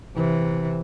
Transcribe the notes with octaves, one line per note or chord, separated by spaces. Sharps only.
C3 E3